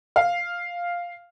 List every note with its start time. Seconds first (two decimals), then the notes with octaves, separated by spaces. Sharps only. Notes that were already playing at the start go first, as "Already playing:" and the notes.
0.16 F5